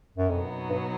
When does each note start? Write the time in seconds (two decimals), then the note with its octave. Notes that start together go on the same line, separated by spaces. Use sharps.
0.18 F#2
0.29 F2 B2 F#3 B3 D#4
0.69 G2